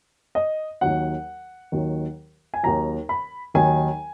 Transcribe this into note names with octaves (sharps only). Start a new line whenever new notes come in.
D#5
D#2 D#3 F#3 F#5
D#2 D#3 F#3
G#5
D#2 D#3 F#3 A#5
B5
D#2 D#3 F#3 G#5